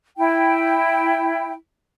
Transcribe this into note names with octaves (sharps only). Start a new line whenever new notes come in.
E4 G5